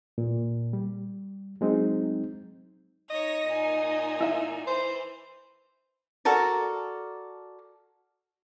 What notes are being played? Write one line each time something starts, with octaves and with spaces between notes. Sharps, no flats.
A#2
G3
F#3 G#3 C4 D#4
D#4 C#5 D#5 A#6
A#2 D#4 G#5
E4 E5
E3 C5
F#4 A4 A#4 D5